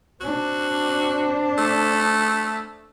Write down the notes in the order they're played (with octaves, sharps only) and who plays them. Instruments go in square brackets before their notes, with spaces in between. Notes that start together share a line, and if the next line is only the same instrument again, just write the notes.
[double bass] C4 D4 [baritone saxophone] F#4
[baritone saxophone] A3